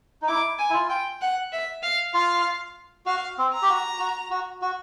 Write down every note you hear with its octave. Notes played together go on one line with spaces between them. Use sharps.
D#4
E4 D6
G#5
E4
F4
G5
F#5
E5
F5
F4 F5
F#4 F5
C4
A#5
G4
F#4
F#4
F#4
F#4